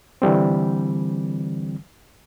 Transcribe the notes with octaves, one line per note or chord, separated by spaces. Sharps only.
D3 E3 G3 C4